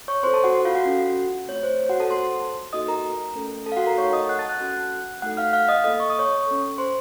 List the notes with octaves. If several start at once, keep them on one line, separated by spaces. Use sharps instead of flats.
C#5 C#6
C4 F4 A4 C5 C6
A4 A5
F#4 F#5
F4 F5
F#4 F#5
C#4 F4 A4
A3 C4 F4 C#5
C5
C#5
F#4 F#5
A4 A5
A#3 F4 A4 C5 C6
A#3 D#4 F#4 A4 D#5 D#6
A#4 A#5
A3 C#4 A4
A4 A5
F5
F#4 F#5
A#4 A#5
A3 D#4 A4 C#5 C#6
D#5 D#6
F#5 F#6
A5 A6
F#5 F#6
C#4 F#4 A4
A3 D#4 F#4 A4 F#5 F#6
F5 F6
F5 F6
D#5 D#6
A#3 F4 A4 D#5 D#6
C#6
D#6
C#5 C#6
C#4 A4
C5 C6